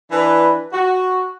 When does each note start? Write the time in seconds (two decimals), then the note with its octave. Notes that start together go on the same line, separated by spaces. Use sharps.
0.12 E3 D4 B4
0.73 F#4